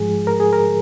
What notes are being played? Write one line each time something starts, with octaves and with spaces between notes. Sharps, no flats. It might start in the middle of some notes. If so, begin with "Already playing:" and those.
Already playing: G#2 F3 G#3 G#4
A#4
G#4
A#4